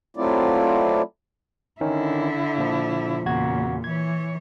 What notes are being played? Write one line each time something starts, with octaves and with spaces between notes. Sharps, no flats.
F#3 A3 C4 E4 F4 D5
D3 D#3 C#4 D#4 E4
A#2 F3
E2 A#2 C#3 F#4 G#6
E3 C#5 G#6